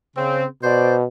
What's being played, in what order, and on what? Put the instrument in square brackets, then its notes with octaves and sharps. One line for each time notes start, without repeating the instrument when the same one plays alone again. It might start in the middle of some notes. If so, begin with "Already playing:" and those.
[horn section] C#3 C4
[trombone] B2 [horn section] C5 D5